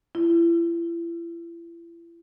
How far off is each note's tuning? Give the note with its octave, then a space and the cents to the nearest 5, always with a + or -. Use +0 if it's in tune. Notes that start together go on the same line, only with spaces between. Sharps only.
E4 +40